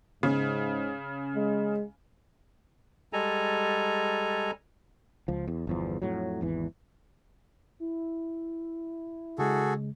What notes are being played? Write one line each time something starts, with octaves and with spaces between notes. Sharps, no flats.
G#2 C#3
G#3
G3 G#3 A4 G#5 A#5
C#2 F3
E2
G1 E2 F3
F2 A2 F#3
G#1 E2 E3
E4
C#3 G#3 F#4 G#4 A4